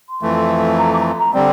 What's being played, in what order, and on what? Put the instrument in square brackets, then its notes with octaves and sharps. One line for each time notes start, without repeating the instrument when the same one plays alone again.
[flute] C6
[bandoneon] F2 E3 A3
[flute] A#5
D6
A#5
C6
A#5
[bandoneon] D3 G3 C4 [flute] D5